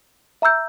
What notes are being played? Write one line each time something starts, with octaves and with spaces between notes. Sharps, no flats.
E5 A#5 E6 G6